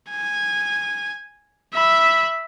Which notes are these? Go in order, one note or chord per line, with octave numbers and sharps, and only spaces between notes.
G#5
E5 B5